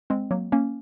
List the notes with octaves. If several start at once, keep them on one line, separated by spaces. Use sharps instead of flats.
G#3 C4
F#3 A#3
A#3 C#4